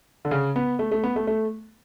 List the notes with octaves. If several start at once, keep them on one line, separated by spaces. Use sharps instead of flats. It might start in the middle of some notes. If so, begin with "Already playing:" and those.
D3
C#3
B3
A3
A3
B3
A3
A3